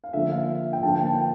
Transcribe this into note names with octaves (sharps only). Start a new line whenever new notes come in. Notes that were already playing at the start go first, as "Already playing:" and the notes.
F5
D3 F3 A#3 E5
F5
G5
D3 F3 A#3 A5
G5
A5